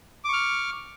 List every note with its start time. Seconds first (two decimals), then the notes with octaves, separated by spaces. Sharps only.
0.24 D6
0.29 C#6
0.33 F6